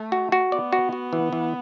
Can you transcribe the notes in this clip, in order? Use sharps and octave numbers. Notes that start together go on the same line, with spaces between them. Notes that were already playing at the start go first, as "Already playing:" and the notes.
Already playing: A3
F#4
F#4
B3 D5
F#4
F#4
E3
E3